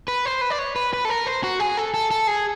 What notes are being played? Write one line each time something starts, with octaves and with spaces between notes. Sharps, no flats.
B4
C5
B4
D5
C#5
B4
B4
A4
A#4
C5
F#4
G#4
A4
A4
A4
G#4